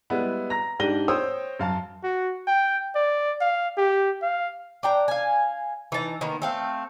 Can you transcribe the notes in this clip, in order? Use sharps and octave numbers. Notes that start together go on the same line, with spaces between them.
G3 G#3 B3 E4
A#5 A#6
G#2 D4 G4 A#6 D#7 G7
C5 C#5 G5 C#6 D#6 E6
F#2 F5 A5
F#4
G5
D5
F5
G4
F5
D4 G5 A#5
F5 G#5
E3 D#4 A5 A#5
D#3 A#3 B3 A#4
A3 C4 F5